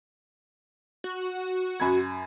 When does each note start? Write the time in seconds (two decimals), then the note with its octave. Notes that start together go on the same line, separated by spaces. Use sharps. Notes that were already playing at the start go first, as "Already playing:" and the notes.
1.04 F#4
1.80 F#2 B5 G#6